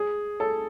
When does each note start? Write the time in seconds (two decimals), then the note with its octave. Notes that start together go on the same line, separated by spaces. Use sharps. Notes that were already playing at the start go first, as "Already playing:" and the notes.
Already playing: G#4
0.40 A4